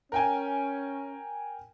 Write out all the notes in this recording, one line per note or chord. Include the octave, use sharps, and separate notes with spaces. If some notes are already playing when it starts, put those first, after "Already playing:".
C#4 A#4 G5 G#5